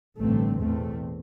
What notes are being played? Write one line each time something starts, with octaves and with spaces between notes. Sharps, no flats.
A1 G2 D3 A3 C4
E2 B2 A3 C4